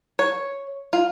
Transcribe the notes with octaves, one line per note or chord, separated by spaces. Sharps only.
C#5
F4